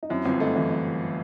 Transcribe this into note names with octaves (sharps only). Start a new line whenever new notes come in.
D#4
F#2 C4 E4
G1 C4
A3 D#4
E3 C4
D#4